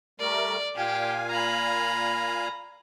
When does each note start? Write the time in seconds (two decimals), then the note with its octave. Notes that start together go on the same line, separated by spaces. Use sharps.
0.20 G3 A3 A#4 D5
0.76 A#2 G4 F5 G#5
1.30 A#5 B5